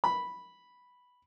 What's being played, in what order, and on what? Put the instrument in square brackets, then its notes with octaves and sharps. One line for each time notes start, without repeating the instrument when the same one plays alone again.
[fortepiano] B5